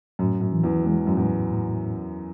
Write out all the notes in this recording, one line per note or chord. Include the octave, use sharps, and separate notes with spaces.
F#2 A2
F#2
E3
E2
E2 G#3
F#2
E2 A2
A2